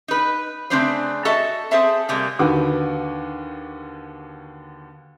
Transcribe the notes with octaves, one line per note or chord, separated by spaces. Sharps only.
D#4 B4
C#3 A3 C4 D4 B4 C5
F#4 A4 D#5 E5 A5
C4 G#4 A4 C5 E5 A5
C3 G3 G#3 A#3
D#2 D3 F#4 B4 D6